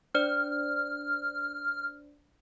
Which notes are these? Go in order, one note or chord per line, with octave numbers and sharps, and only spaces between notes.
D4 C5 D5 F6